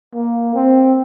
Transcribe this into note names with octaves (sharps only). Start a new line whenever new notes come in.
A#3
C4